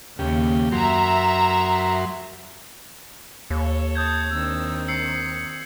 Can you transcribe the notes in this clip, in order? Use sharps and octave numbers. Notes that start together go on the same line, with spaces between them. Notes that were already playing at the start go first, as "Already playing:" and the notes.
D#2 C#3 G4
F#2 F#3 E5 A#5 C6
D#2 A4 C#5
A5 D#6 G6 G#6
D#3 C4 D4 E6
E6 C7 C#7